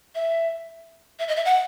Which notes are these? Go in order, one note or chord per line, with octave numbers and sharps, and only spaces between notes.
E5
E5
D#5
E5
F#5